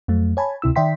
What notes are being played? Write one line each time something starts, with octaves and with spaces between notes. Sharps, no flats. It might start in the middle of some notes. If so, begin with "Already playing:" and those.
F2 F#3 A3
C#5 G#5 A5 B5
D2 C3 E4 E6
D#3 D5 E5 G5 C6 B6